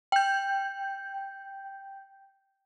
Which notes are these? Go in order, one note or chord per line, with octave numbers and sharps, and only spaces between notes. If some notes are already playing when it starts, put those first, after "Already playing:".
G5 G6